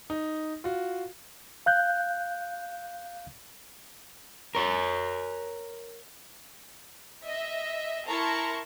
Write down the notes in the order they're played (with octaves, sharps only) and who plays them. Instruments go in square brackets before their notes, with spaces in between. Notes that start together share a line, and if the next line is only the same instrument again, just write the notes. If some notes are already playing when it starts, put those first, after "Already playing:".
[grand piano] D#4
F4 F#4
[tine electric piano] F5 F#6 G6
[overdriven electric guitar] A#4 C#5
[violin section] D#5 E5
E4 A#4 A5 A#5 C6 C#6